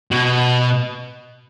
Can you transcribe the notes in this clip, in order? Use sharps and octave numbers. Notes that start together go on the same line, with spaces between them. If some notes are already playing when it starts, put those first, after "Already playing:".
B2